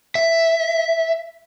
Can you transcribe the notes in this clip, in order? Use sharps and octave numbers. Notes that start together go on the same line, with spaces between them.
E5